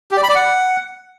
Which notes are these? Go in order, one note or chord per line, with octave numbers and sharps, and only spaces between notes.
G4
D5
B5
D5
F#5